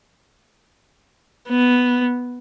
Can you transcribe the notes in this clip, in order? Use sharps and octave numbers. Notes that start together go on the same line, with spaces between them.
B3